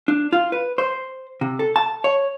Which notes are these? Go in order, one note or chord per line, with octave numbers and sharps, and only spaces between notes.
D4
F4
B4
C5
C3
A4
A5
C#5